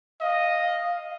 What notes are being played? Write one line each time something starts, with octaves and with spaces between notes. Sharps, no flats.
D#5 F5